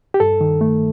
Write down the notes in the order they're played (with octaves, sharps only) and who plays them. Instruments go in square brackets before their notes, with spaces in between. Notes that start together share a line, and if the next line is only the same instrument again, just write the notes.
[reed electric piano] G4
G2 A4
D#3
A3